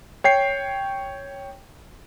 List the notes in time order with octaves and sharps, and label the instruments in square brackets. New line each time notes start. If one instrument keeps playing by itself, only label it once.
[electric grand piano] C#5 G5 C7